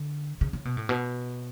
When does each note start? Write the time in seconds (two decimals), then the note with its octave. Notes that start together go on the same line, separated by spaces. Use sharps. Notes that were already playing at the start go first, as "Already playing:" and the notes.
Already playing: D3
0.41 C#3
0.53 C#3
0.65 B2
0.77 A2
0.89 B2